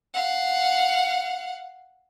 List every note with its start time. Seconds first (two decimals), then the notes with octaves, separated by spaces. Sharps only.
0.14 F5 F#5